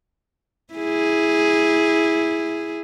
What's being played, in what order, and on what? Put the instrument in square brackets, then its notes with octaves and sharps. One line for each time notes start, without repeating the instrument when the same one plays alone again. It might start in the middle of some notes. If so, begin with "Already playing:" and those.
[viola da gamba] E4 G#4